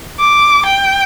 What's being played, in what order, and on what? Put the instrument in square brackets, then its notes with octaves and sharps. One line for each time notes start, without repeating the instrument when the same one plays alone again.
[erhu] D6
G5